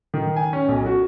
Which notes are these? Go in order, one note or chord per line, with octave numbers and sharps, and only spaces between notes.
D#3
G#5
C#4
B1
F#4